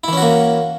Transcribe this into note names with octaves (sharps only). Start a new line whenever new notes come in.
E3 A#3 C#4 E4 F#4